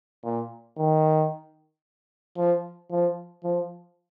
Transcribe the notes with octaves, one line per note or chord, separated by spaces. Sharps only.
A#2
D#3
F3
F3
F3